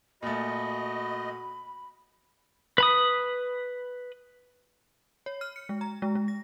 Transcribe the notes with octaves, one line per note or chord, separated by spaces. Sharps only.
A#2 A3 F#4 D#5 B5
B4 B5 D#6
C#5
F6
C#7
G#3
A#5
G#3
G#3
A#6